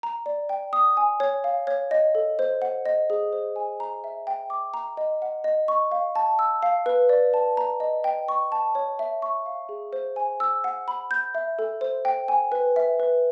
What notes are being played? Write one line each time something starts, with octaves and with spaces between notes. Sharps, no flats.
A#5
D5
G5
D#6
G#5
C#5
F5
C#5
D#5
A4
C5
F#5
D#5
G#4
C5
G#5
A#5
E5
G5
D6
A#5
D#5
F#5
D#5
C#6
F5
A5
E6
F5
B4
D5
A5
A#5
D#5
G5
C#6
A5
C#5
E5
C#6
F5
G#4
C5
G#5
E6
F#5
B5
G6
E5
A4
C5
G5
G#5
B4
E5
B4